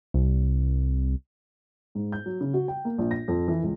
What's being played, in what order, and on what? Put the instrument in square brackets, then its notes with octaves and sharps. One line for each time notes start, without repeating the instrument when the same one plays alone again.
[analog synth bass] C2
[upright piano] G#2
G6
F#3
C#3
F#4
G5
A#3
A#1
A#6
F2
E3
C#2